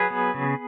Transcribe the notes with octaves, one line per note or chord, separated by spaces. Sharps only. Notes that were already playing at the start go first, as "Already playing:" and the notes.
Already playing: F#3 G#4 B4
B3
C#3